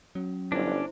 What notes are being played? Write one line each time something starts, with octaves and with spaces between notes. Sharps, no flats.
F#3 C#4
G1 C#4 D4 E4 C5